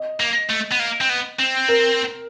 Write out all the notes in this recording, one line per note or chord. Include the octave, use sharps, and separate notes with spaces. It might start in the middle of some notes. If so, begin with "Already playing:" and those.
Already playing: D#5
A#3
A3
B3
A#3
C4
B3
C4
A#4